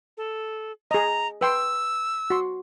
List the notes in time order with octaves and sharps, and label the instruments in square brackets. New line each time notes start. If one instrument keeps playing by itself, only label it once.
[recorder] A4
[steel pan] G#4 D#5 [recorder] A#5
[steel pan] B4 G5 C6 [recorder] E6
[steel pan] F#4 C6